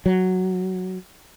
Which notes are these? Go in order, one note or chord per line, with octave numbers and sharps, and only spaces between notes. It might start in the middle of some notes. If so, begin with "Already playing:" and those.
F#3